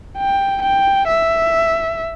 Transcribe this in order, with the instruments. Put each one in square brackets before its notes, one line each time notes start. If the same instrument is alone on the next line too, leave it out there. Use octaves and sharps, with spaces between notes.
[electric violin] G5
G5
E5